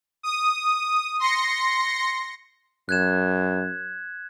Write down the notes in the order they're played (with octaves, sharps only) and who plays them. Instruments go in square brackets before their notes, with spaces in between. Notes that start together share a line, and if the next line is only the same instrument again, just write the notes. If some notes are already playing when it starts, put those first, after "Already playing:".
[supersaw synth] D#6
C6 A#6 C#7
[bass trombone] F#2 [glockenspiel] F#6 G#6 E7